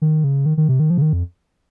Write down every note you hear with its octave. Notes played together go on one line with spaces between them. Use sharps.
D#3
C#3
D#3
D#3
C3
D#3
F3
C#3
D#3
F2